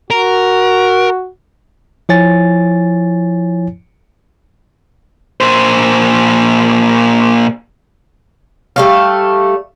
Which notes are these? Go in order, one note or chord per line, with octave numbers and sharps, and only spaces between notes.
F#4 A#4
F3 E4 C#5 G#5 A6
A#2 C5
G3 A3 F5